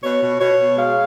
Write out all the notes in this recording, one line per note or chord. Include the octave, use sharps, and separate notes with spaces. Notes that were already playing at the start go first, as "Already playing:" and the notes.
B2 C#5
B2
B2 C#5
B2
G#3 F5